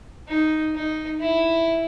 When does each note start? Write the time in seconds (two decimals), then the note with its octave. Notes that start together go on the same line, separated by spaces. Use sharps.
0.29 D#4
0.75 D#4
1.21 E4